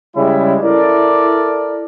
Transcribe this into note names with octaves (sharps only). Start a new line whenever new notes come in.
C#3 G3 G#3 C#4 E4
E4 A4 A#4 D5